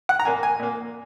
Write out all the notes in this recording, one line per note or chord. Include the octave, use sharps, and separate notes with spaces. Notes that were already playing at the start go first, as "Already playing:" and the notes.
F#5
A#5
A#2 A#3 G#5
G#5
A#2 A#3